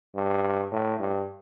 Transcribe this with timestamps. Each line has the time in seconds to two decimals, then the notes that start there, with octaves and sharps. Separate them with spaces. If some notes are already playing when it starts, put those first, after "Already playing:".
0.15 G2
0.71 A2
0.99 G2